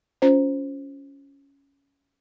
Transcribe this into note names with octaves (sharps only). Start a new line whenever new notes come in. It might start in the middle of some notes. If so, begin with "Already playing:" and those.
C#4 F4 C5